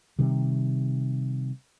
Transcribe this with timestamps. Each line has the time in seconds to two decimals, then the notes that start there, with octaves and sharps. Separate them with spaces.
0.19 C3 D#3 G3